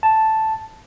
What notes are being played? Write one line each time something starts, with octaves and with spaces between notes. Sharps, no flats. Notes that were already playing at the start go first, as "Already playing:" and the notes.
A5